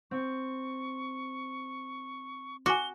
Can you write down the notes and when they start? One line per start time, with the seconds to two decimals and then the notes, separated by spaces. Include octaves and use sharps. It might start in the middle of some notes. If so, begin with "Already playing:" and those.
0.11 C4 C#6
2.66 F#4 G#5 D6 F#6 G7